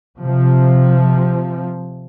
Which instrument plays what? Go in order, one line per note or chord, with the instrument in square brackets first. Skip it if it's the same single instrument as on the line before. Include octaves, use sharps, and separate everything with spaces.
[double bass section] C3 F3